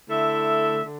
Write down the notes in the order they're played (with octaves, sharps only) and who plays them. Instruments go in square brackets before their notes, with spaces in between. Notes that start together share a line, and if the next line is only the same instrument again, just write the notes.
[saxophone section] D3 A3 E4 A4 E5
D3